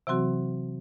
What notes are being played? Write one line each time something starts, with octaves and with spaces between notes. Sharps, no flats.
C3 E3 F#3 C4 F#4